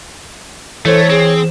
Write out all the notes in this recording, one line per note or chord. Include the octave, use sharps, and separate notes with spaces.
E3 A3 A4 C5 C#5
C4 G#4